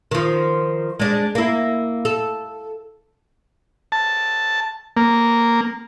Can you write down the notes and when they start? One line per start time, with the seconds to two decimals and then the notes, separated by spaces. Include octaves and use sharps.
0.11 D#3 F3
1.00 G#3 D4
1.35 A#3 E4
2.05 A4
3.92 A5
4.97 A#3